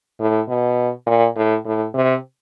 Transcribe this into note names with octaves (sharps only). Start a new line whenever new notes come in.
A2
B2
A#2
A2
A2
C3